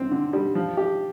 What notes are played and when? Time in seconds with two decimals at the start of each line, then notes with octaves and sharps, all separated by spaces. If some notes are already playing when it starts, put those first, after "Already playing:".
Already playing: D3 C4
0.11 D3
0.33 G3
0.55 F3
0.77 G4